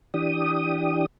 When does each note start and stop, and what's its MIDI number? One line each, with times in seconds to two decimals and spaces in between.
0.14 1.06 52
0.14 1.06 62
0.14 1.06 67
0.14 1.06 87